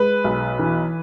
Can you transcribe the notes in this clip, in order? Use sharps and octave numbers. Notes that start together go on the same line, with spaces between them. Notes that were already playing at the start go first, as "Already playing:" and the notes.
Already playing: G#3 B4
B1
E3